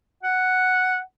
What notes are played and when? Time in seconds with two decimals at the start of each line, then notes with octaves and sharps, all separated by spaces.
0.23 F#5